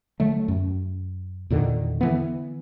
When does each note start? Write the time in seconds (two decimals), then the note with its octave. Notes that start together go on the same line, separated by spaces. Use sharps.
0.20 D3 F#3 A3
0.48 F#2
1.50 E2 A#2 D3 D#3
2.01 D3 E3 B3